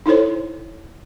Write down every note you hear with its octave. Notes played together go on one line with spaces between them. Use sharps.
D#4 E4 A4 C5 C#5